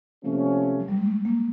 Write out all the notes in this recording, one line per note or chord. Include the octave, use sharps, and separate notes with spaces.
C3 F3 A3 A#3 C#4
F#3
G3
G#3
A3
A#3